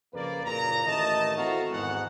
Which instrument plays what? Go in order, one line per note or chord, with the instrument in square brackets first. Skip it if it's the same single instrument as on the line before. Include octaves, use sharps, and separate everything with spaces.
[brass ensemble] F2 C#3 A#3 B4 D5
F#1 A#2 A#5
A1 D#3 A3 D#5 A5
C4 E4 F#4 A4 F5 A#5
G#1 E2 G#2 G#3 F#5